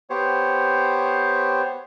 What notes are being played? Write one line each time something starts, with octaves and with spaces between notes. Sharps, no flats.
B3 G4 C5 C#5